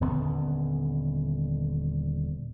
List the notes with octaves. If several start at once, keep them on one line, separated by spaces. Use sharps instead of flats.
D#1 D3 B3 C#4